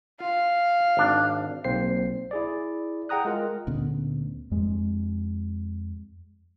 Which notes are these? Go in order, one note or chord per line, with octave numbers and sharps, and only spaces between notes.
F4 F5
G#1 D4
B1 A#3 C4 C5 C7
E4 G#4 D5
G#4 F#5 G5 A#5 D#6 F#6
G#3 F4 A#4
D2 A#2 B3 C#4
F2 G#3